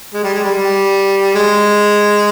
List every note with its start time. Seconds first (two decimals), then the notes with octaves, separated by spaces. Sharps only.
0.14 G#3
0.24 G3
0.34 G#3
0.44 G3
0.54 G3
1.35 G#3